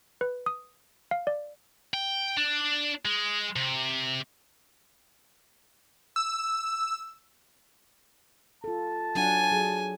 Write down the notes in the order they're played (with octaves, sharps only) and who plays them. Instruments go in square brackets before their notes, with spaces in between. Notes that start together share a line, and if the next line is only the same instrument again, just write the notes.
[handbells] B4
D#6
F5
D5
[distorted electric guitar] G5
D4
G#3
C3
[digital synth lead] E6
[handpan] F4 A4 [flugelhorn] A5
[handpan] F#3 D4 F#5 [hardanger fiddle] G#5
[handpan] F#3 G#4